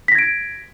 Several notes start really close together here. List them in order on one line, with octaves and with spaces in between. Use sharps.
B6 A#6 G#6 D7